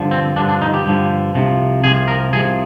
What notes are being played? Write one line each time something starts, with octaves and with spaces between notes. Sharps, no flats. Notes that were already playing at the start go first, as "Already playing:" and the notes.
Already playing: G2 D3 F3
C4
G2 D3 F3 D4
D4
D#4
G4
G2 D3 F3
C2 C3 F3
C2 C3 F3 G#4
A#4
C2 C3 F3 G#4